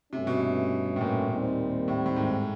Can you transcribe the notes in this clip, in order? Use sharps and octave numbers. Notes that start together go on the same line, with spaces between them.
G2 C3 E3 A3 C#4
B2
A2
A#2
D#2 D#3 G3 C4
A2
A2
G#2